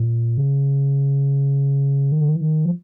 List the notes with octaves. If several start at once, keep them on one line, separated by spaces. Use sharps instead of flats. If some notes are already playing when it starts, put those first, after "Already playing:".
Already playing: A#2
C#3
D#3
D3
D#3
E3
D#3
F3